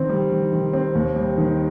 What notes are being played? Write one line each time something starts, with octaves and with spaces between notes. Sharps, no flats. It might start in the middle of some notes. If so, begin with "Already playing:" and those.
Already playing: D#3 C4
G3
D#3
D#3
C4
D#2
G3
D#3